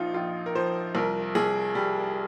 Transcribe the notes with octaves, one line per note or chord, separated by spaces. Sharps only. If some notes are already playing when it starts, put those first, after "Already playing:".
Already playing: A#1 F3 D#4 F4
A#1 F4
A#4
F3 C5
C2 A#4
C2 G#4
G3